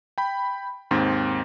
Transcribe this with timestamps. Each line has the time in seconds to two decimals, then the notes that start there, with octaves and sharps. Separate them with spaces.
0.18 G5 B5
0.91 D#2 G#2 C4